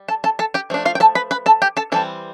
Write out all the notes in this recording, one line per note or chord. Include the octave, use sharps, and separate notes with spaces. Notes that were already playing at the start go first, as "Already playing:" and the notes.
Already playing: G3
A4 A5
A4 A5
A4 A5
G4 G5
F3 A3 D4
F4 F5
G5
A4 A5
B4 B5
B4 B5
A4 A5
G4 G5
A4 A5
E3 G3 C4 A4 A5